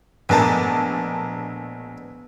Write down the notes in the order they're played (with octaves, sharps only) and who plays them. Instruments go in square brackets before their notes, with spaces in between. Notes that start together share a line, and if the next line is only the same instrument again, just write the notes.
[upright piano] A#1 A#4 A5 [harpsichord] B2 G#3 A3